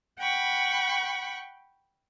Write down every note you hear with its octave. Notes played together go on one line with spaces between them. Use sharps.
F#5 G5 B5 C#6